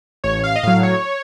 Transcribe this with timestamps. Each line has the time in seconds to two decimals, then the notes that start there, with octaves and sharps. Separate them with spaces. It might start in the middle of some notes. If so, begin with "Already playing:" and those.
0.24 A1 C#5
0.43 F5
0.56 D#5
0.63 A2 F#3 F5
0.83 C#5